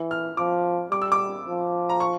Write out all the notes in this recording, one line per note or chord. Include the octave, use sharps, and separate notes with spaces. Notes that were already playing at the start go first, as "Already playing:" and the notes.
Already playing: E3
F6
F3 D6
G3 D6
E6
D6
F3
A#5
C#6